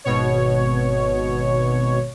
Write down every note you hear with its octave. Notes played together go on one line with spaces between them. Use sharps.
G#1 B2 C#5